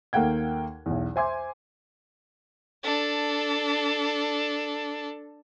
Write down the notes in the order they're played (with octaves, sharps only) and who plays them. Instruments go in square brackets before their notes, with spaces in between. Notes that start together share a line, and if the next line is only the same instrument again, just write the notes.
[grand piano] D#2 A#3 A4 F#5 G5 G#6
B1 E2
C5 E5 G#5 C6 D6 G#6
[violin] D4 A4